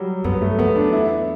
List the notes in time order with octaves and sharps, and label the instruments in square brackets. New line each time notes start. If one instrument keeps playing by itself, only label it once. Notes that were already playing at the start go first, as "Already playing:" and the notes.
Already playing: [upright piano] F#3 G3
[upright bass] G2 [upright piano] B3
[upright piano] A3
[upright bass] E2 [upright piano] B3
[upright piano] D4
E4